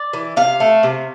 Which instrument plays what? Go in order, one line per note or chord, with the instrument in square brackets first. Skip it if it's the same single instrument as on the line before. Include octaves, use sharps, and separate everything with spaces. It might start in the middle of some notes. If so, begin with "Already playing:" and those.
Already playing: [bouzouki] D5
E3
C3 F5
A3
C3